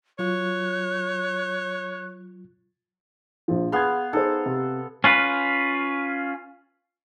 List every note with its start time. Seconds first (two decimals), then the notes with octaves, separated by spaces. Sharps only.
0.19 F#3 F4 C#5 C#6 F#6
3.48 A#1 F3
3.72 B3 G#4 F5 C6 G#6
4.13 D#4 G#4 A4 C5
4.46 C3
5.04 C#4 F4 B4